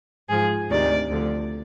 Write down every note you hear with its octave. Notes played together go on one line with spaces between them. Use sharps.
G#2 F3 G#4
D2 C3 D#3 D5
D2 D3 F3